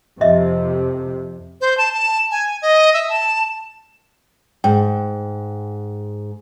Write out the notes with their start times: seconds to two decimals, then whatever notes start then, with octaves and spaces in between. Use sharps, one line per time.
0.21 F2 C3 D#5 E5
1.61 C5
1.78 A5
1.94 A5
2.31 G#5
2.62 D#5
2.94 E5
3.09 A5
4.64 G#2 G5